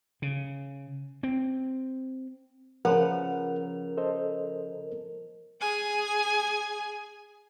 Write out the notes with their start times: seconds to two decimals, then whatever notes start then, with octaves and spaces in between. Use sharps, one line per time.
0.22 C#3
1.23 C4
2.85 C#3 F3 A#4 B4 F#5
3.97 A4 C5 D#5
5.61 G#4 G#5